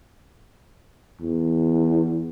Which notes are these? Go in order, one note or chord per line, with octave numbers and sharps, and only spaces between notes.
E2